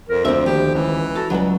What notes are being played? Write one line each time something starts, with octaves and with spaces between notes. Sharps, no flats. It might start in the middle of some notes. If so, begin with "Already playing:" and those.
F2 A#4
D2 F3 C4 E5
D#2 G4
C#2 E3
F#4 A4
C#2 F#3 G3 B4